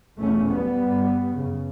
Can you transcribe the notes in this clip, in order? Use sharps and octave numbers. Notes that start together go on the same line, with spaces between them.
E2 B2 A3 C#4
G3 B3
G2
F#2 C#3